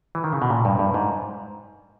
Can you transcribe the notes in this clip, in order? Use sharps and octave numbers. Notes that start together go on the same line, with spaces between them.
E3
D#3
C#3
B2
A#2
G2
G2
G#2